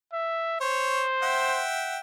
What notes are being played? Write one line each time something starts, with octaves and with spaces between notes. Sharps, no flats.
E5
C5 C#5
E5 F#5 G5